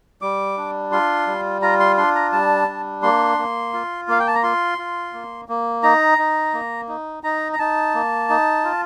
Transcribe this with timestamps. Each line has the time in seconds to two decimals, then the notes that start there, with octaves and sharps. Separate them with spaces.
0.22 G3 D6
0.57 D4
0.92 F4 C6
1.27 G3
1.62 F4 A#5
1.80 C6
1.97 D4 C6
2.15 A#5
2.32 G3 A5
2.68 D4
3.03 A#3 C6
3.38 A#3
3.73 F4
4.08 A#3 F5
4.20 G5
4.27 A5
4.35 A#5
4.43 F4 C6
4.78 F4
5.13 A#3
5.49 A#3
5.83 D#4 A#5
6.18 D#4
6.54 A#3
6.89 D#4
7.23 D#4 A#5
7.53 A#5
7.59 D#4 A5
7.94 A#3
8.30 D#4
8.64 F4